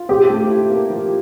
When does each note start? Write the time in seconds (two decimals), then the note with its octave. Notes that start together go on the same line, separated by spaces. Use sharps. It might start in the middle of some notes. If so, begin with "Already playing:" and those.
Already playing: F4
0.09 C4 G4
0.30 A3
0.49 E4
0.70 A#3
0.90 F3